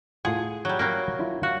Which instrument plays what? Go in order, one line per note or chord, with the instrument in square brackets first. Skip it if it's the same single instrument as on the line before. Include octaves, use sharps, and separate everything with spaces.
[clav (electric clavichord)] A2 F4 F#5 [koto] G#4
[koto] F#3 G3
F#3 G3 A#3
[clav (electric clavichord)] D4 E4 F4
[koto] F#4 [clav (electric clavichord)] F5